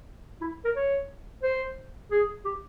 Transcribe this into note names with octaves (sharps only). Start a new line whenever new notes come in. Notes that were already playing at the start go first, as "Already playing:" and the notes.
E4
A#4
C#5
C5
G#4
G4